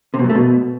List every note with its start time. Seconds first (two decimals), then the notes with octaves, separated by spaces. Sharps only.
0.14 C3
0.19 B2
0.24 F#2
0.30 A3
0.35 B2